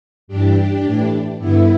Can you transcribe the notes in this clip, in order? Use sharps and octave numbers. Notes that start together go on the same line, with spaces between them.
G2 E3 D4 G4
A2 E3
G2 D3 B3 E4